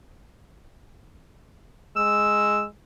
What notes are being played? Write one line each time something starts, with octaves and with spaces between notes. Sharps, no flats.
G#3 E6